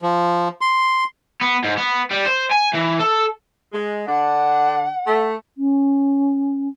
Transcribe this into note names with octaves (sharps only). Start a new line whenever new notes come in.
F3
C6
B3
G#2
B3
G3
C5
G#5
E3
A4
G#3
D3 D4 F#5
A3
C#4